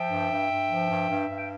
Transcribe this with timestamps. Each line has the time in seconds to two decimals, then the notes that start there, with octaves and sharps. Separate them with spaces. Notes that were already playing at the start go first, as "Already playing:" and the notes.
Already playing: F3 E5 G5
0.08 G2
0.29 G2
0.49 G2
0.69 F3
0.88 G2
1.09 G2
1.28 G2
1.37 G5